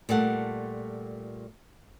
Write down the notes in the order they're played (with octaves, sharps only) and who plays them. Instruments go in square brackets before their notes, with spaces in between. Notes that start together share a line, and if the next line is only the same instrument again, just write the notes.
[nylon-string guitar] A#2 G3 A3 F#5